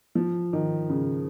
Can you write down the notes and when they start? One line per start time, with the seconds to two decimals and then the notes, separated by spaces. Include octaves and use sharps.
0.15 F3
0.53 D#3
0.90 C#3